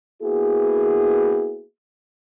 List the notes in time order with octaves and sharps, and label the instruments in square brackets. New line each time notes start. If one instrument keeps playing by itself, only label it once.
[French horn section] A#3 B3 E4 F#4 G#4